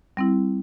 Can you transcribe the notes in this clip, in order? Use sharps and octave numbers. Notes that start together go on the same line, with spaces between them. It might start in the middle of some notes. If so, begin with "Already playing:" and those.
G3 C4 E4